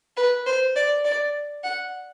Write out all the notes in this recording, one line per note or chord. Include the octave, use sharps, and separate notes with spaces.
B4
C5
D5
D5
F#5